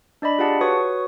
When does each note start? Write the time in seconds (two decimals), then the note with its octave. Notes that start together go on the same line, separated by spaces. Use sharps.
0.22 D4 D5 D#5 B5
0.38 F4 G4 G#4 F5 F#5 A5
0.61 F#4 B4 C#5 C#6 D#6